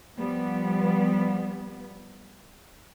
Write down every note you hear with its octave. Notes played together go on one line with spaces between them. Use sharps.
F3 G3 B3